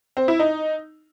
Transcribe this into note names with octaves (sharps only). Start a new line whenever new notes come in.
C4
E4
D#4